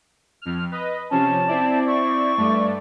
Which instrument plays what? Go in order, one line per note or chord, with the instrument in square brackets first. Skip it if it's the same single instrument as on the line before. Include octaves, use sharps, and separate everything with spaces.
[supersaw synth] F2 F6
B4 D#5
[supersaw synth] C3 F3 C#4 [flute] A5
[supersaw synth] C4 E4 D5
[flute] C#6
[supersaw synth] G2 A3 D5